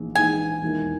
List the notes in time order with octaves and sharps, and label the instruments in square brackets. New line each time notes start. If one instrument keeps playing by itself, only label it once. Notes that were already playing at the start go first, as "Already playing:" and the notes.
Already playing: [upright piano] A#1 G#2 E3
[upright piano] A#1 G#2 E3 [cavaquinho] G#5
[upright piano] E1 D#2 D#3 A#3 E4